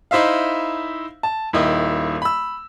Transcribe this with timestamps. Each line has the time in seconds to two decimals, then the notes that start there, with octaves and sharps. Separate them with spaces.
0.11 D#4 E4 C5 E5 F5
1.23 A5
1.53 D#1 D#3 E4 D#5
2.22 B5 E6